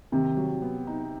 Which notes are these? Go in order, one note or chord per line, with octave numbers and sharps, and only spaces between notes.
C3 D#3
F#3
B3
D#4